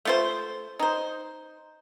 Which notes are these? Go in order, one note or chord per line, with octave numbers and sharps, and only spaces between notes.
A3 F4 C5
D#4 C5